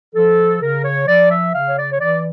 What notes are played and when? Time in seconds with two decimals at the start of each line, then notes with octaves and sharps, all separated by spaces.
0.15 F3 A4
0.61 C#3 A#4
0.84 C#5
1.08 F3 D5
1.31 E5
1.54 C#3 F5
1.69 C#5
1.78 D5
1.92 C#5
2.01 E3 D5